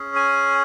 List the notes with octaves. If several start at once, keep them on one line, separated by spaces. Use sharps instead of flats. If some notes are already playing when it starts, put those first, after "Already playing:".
Already playing: C#4 G#4
G#5